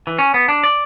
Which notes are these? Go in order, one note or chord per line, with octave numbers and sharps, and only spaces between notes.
E3
C#4
B3
D4
D5